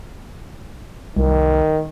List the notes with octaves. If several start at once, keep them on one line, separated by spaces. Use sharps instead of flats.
C2 D#3